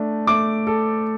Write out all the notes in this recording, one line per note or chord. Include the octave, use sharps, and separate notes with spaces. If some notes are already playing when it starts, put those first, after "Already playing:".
Already playing: A3 D4
A3 D6
A4